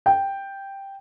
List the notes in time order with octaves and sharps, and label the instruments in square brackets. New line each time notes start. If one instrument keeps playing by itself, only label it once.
[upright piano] G5